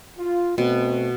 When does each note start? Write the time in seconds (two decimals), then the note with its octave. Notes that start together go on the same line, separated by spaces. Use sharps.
0.19 F4
0.58 B2 A3 C4